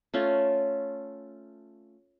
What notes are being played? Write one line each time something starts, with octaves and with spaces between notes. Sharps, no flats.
A3 C#4 F4